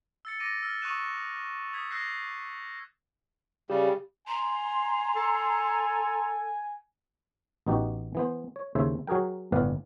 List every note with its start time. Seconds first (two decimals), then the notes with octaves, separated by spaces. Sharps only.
0.25 E6 A6 C#7
0.40 D6 A6 A#6 D7 D#7
0.62 E6 F6 A6
0.82 C#6 D#6 E6 F#6 D#7 E7
1.73 D#6 G#6 B6
1.91 E6 F#6 G6 A#6 C7
3.70 C#3 G3 G4
4.28 G#5 A#5 C6
5.16 A4
7.66 A1 B3 D#4 F#4 G4
8.15 E3 B3 C5
8.56 C#5
8.75 D#2 C#3 E4 C5 E5
9.07 F#3 F#4 G#4 A#4 G5
9.52 G1 A2 B3 B4 D5 F5